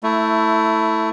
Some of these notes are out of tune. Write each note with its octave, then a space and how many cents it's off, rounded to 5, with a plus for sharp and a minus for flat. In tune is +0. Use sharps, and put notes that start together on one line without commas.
A3 +15 E4 +0